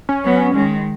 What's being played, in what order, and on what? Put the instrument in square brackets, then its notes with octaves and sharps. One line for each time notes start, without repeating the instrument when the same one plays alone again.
[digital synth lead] C#4
[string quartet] F#3 B3
D#3 G#3